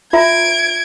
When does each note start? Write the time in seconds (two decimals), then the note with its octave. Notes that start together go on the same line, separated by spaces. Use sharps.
0.13 F4 E5 A#5 G#6 D7